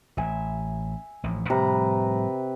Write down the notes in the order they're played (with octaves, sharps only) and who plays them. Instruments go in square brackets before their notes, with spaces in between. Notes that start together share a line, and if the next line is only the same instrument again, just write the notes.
[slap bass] A1 [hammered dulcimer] E5 G#5
[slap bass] A1 A2 F3
[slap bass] A2 F3 G3 [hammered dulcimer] C3 B4 A#5